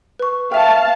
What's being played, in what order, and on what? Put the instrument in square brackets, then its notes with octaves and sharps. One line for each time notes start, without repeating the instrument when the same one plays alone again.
[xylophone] B4 C#6
[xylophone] E5 G5 [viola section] F5 A5